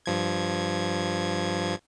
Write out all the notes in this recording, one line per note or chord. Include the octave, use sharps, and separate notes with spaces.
G2 F3 G#6